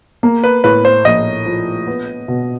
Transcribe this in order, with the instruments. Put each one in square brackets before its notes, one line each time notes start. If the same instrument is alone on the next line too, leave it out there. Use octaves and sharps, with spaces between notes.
[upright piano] A#3
[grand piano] B4
[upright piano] A2 [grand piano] B4
[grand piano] C5
[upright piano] A#1 [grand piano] D#5
[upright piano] F3
B3
B2